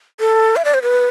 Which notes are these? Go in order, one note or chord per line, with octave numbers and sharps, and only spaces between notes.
A4
E5
D5
C5
B4